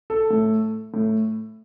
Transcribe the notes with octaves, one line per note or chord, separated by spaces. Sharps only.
A4
A2
A2